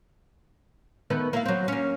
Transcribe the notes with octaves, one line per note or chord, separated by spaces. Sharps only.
D#3 A3 B3
A#3 E4 F5
F#3 C4
A#3 C#4